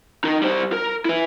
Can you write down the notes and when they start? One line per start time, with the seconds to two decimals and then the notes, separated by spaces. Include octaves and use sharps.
0.24 D#4 A#4
0.42 G3 C5
0.73 A#4
1.05 E4 B4